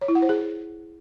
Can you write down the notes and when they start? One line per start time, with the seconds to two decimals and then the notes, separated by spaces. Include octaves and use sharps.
0.01 C#5
0.08 E4
0.15 F#5
0.22 C5
0.29 G#4